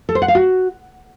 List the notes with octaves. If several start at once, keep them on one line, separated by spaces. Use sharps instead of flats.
A4
C5
F#5
F5
F#4